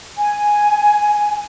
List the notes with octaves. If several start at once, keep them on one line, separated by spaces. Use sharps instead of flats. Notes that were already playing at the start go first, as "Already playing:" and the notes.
G#5